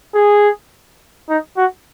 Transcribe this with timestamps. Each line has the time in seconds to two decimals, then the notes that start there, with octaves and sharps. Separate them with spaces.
0.15 G#4
1.29 D#4
1.57 F#4